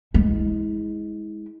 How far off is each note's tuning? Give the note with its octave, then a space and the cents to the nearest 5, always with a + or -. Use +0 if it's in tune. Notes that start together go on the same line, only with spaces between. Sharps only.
G#3 +0 E4 -45